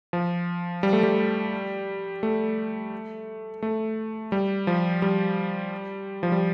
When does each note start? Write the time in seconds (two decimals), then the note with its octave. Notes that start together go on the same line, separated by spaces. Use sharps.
0.13 F3
0.83 G3
0.93 A3
1.03 G3
2.23 A3
3.62 A3
4.32 G3
4.67 F3
5.02 G3
6.23 F3
6.32 G3